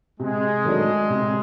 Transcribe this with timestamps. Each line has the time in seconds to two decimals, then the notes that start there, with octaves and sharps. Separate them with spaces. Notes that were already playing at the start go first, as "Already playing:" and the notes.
0.20 C3 G#3
0.65 D#3 F#3 A3 D4
1.10 C3